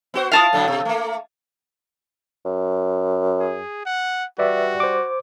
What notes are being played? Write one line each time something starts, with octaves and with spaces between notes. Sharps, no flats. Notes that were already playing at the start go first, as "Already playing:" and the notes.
B3 F#4 C5
E4 F4 F5 A5 D#6
A2 D3 F#3
B2
A3 A#3
F#2
G#4
F#5
G3 F#4 B4 D5 E5
C5 D6